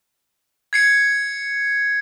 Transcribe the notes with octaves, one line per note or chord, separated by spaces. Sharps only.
G#6 C7 C#7